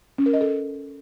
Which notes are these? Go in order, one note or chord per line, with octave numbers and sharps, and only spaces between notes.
C#4
A#4
D#5
A4